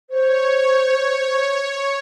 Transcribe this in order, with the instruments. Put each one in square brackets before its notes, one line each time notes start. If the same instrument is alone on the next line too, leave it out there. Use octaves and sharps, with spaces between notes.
[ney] C5 [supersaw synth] C#5